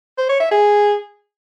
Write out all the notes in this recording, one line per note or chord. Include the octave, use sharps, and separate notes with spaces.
C5
C#5
E5
G#4